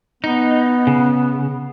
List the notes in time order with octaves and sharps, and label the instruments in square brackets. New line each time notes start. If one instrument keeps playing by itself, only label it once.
[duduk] B3 [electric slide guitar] D#4
[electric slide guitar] C#3